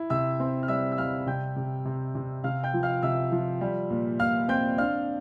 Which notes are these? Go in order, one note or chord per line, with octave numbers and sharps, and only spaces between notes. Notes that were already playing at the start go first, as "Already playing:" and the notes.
Already playing: E4
C3 E5 E6
C4
F6
G3 E5 E6
E6
G3 F5 F6
C3 G5 G6
C3
C3
C3
C3 F5 F6
G5 G6
F3
F5 F6
C3 E5 E6
F3
G3
A#2
A#2 F5 F6
C4 G5 G6
D4 F5 F6